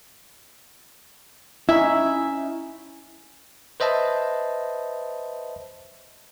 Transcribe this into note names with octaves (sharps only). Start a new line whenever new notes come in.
C#4 D#4 E4 E5 G#5
B4 C5 D#5 E5 A5